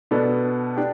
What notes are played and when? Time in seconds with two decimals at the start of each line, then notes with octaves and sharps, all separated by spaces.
0.11 B2 B3 D4 A4
0.77 D4 G4